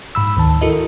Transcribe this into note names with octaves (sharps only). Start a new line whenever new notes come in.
G#2 B5 E6
D2 D#3 A5
E4 F#4 A4 A#4 D#5